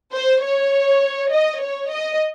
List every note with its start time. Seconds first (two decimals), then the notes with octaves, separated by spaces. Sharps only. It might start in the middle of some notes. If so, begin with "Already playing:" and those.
0.13 C5
0.43 C#5
1.32 D#5
1.61 C#5
1.91 D#5